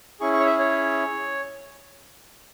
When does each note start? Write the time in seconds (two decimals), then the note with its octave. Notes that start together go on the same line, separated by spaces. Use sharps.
0.20 C#4 E4 G#4 C#6
0.33 C#6
0.40 C#5
0.46 E5
0.60 C#5